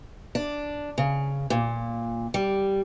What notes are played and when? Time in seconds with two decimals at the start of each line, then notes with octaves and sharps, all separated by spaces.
0.35 D4
0.98 C#3
1.50 A#2
2.34 G3